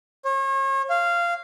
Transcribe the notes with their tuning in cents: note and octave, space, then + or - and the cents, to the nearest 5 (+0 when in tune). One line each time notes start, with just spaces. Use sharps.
C#5 -40
F5 -15